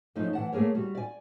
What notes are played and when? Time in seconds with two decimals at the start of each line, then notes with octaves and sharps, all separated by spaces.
0.15 F#2 F3 A3 D#4
0.33 E3 F#5 A5
0.52 A3 A#3 G#4 A#4 C#5
0.75 G3 F#4
0.95 D5 G#5